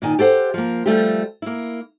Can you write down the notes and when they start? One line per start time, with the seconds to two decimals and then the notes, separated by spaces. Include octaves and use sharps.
0.02 A#2 D#3 G#5
0.19 G4 A4 C5 F#5
0.54 F3 A#3
0.86 F3 G3 A3 G4
1.42 A#3 E4